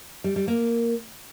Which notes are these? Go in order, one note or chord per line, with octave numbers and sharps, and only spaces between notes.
G3
G3
A#3